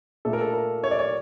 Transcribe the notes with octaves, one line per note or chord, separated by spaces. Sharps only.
A#2 A3 A4
A#4
A4
A#4
C#5
D5
C#5